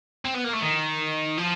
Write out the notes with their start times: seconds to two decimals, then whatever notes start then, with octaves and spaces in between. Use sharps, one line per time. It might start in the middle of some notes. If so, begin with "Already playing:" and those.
0.25 C4
0.34 B3
0.44 A#3
0.53 A3
0.62 D#3
1.38 F3